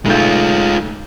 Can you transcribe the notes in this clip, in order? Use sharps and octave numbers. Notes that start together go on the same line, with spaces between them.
B1 G#3 A3 F4 G6